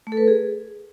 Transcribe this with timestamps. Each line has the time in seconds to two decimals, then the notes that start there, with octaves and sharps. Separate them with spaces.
0.07 A3
0.12 A4
0.17 B4
0.22 A#4
0.28 G#4